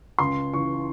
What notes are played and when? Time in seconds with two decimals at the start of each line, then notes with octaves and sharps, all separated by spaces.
0.19 C#2 C6
0.53 C#3 E3 C#6